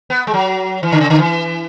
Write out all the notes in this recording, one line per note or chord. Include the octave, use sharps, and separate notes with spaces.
B3
G#3
F#3
E3
D3
C#3
D3
E3